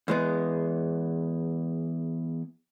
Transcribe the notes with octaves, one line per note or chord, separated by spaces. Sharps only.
E2 G#3 B3